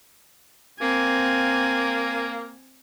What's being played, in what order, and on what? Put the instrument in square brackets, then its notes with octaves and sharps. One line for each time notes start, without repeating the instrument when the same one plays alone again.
[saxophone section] A#3 [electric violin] C4 G#5